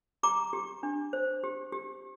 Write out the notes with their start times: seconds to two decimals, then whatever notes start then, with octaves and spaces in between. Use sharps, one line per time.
0.23 G4 A#5 D6
0.53 G4
0.83 D4
1.13 C5
1.44 G4
1.72 G4